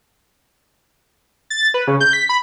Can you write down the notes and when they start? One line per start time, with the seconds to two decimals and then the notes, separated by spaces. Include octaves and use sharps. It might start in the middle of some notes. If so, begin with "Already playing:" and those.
1.50 A6
1.74 B4
1.87 C#3
2.01 G6
2.13 B6
2.29 B5